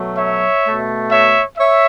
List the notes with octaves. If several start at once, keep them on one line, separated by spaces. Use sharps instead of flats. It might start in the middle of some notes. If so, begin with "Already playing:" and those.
Already playing: B2 F#3 A3
C#5 E5
B2 A3
C#5 E5
C#5 E5